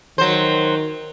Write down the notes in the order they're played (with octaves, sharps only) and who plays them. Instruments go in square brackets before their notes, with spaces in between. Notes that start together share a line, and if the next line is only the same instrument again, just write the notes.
[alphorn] D#3 [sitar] F#3 C5